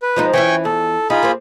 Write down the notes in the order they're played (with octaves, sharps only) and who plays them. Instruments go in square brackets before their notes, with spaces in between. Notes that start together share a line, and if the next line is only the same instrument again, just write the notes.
[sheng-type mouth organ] B4
[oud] F3 G#3 D#4
[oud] E3 C#4 E4 [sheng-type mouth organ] G5 G#5 C#6
[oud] E2 [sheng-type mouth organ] A4
[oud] D#4 [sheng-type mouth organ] F4 G#4 B5
[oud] A#3 C4